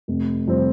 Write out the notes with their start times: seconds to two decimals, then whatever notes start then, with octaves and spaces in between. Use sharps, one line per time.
0.08 F1
0.47 F2 C3 G3 C4